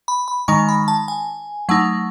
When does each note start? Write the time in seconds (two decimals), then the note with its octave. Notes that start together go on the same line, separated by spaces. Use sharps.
0.08 B5
0.28 B5
0.48 D#3 G#3 D#4 C#6
0.69 B5
0.88 A5
1.08 G#5
1.69 F#3 A3 D#4 F#5